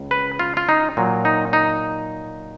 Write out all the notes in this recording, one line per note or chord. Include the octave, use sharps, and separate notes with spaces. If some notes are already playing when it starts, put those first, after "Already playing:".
Already playing: C#2
B4
F4
F4
D#4
A#2 F#3
D#4
D#4